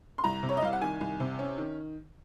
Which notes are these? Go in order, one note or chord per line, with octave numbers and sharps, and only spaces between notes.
C6
C2 A#5
C3
C#5
D#5
C2 F5
F#5
D#3 G#5
C2
C3
C#4
D#3